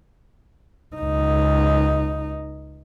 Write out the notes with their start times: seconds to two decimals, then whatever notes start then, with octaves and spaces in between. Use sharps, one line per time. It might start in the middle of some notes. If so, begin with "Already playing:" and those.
0.96 C#2 D#4